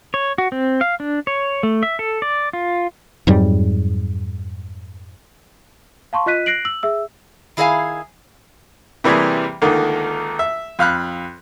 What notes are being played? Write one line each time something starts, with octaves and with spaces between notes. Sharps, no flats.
C#5
F#4
C4
F5
D4
C#5
A3
E5
A4
D5
F4
F2 G#2 F#3 G3
F5 A5 C6 C#6
F4 D#5 F#6 B6 D#7
F#6 A#6 C7 D7 F#7
E6 F#7
G#4 E5 E6
D#3 E4 G#4 D#5 F5 G#5
C3 E3 G3 A#3 G#4
C#2 D3 D#3 A3 A#3
E5
F2 F5 B5 F#6